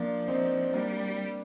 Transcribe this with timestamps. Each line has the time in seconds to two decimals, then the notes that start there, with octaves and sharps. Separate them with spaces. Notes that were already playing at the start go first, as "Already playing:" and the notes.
Already playing: F3 A#3 D4
0.28 C4 D#4
0.73 G3 A#3 D4